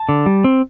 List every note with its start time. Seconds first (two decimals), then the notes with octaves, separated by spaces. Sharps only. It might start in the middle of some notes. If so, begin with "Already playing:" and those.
Already playing: A5
0.09 D3
0.26 G3
0.44 C4